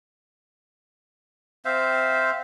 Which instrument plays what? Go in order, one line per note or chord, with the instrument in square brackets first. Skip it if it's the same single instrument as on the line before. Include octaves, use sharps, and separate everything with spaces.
[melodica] C4 C5 E5 F5